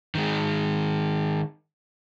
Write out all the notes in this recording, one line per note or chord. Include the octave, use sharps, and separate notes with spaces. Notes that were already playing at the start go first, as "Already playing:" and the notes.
D#3 G#3